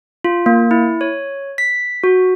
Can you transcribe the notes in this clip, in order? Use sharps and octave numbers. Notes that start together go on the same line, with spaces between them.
F4
A#3
E4
C#5
B6
F#4